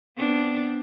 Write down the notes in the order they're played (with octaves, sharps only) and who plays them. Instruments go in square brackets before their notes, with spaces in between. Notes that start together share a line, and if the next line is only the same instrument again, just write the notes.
[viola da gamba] B3 C4 D4